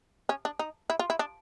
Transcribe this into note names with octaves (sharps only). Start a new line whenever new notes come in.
C#4
D4
D#4
E4
F4
E4
D4